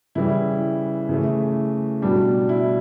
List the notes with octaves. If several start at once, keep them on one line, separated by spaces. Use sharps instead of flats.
C#3 E3 G3 E4
C#3 E3 A3
B2 G3 D4
E4